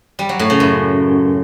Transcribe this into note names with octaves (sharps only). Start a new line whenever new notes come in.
G3
F#3
A2
C#3
F#2